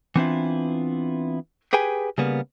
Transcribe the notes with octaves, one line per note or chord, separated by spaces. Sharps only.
E3 B3 C4 D4 E4 F4
G4 G#4 B4 G5 G#5
C#3 G3 A#3 B3